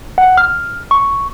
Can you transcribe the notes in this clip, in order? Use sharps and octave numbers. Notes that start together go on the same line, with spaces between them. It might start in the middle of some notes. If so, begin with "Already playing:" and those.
F#5
F6
C#6